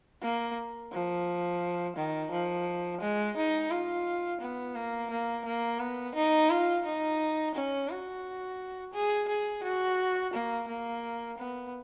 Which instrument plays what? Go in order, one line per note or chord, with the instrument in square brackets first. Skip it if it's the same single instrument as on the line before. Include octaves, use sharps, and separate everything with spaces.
[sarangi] A#3
F3
D#3
F3
G#3
D#4
F4
B3
A#3
A#3
A#3
B3
D#4
F4
D#4
C#4
F#4
G#4
G#4
F#4
A#3
A#3
B3